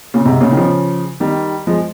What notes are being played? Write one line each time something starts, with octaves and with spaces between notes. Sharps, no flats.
A#2 C#3
G#2 C3
A#2 C#3
D#3
C#3 F3
D#3 G3
F3 G#3